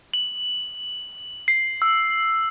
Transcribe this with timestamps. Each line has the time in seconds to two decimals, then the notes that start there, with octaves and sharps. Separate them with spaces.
0.14 F#7
1.48 C7
1.82 E6